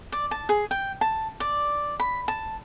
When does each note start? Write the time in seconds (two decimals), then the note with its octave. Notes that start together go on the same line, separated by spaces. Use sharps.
0.12 D5
0.31 A5
0.49 G#4
0.71 G5
1.01 A5
1.40 D5
2.00 B5
2.28 A5